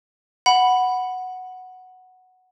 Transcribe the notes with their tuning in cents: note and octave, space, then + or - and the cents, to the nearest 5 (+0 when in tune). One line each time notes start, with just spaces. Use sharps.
F#5 +0 B5 +0